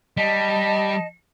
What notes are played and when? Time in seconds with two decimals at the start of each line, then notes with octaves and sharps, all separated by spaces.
0.17 G3 D#5 A5